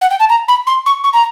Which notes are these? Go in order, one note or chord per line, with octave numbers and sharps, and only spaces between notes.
F#5
G5
A5
A#5
B5
C6
C#6
C#6
A#5